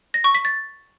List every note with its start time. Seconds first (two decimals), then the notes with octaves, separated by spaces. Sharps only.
0.14 A#6
0.24 C#6
0.35 B6
0.45 A6